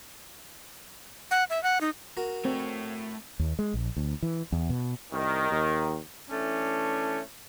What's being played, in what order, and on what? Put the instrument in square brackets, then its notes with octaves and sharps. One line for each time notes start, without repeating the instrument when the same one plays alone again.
[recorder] F#5
E5
F#5
D#4
[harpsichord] F#4 A#4
[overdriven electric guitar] A3 C#5 [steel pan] C4
[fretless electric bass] D#2
G#3
A#1
D2
E3
E2
B2
[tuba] C2 [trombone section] D#3
[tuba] D#2
[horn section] E3 A3 C#4 D4